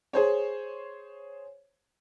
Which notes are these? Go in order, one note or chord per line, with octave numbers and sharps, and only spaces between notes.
G#4 C5 C#5